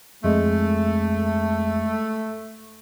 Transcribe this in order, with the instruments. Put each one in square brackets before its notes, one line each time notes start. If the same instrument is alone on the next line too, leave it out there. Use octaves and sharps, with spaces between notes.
[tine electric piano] F2 G#3 [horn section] A3